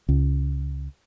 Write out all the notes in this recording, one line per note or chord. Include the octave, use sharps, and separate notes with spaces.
C#2